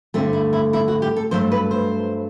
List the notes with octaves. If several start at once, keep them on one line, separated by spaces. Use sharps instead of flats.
G2 D3 A3 C4
E4
E4
E4
F#4
G4
A4
G2 F#3 A3 C5
B4
C5